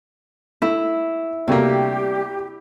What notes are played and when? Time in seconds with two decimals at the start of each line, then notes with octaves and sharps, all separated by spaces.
0.62 A3 E4
1.48 D2 C3 G3 A3 A#3 G4